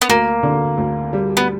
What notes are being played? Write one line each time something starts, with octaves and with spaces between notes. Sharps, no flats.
B3
D2 A#3
D3
D2
G3
B3